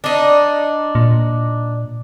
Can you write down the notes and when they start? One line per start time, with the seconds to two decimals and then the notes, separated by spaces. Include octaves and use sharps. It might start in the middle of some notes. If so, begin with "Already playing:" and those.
0.04 D4 D#4
0.95 A#2